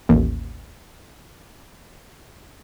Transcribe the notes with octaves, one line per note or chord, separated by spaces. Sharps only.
A1 D#2